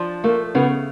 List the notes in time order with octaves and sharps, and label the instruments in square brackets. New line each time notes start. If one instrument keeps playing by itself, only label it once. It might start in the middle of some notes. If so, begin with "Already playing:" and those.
Already playing: [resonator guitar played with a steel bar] F3 D4
[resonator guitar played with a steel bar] A3 [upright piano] A#3
[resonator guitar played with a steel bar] C#3 [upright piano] B3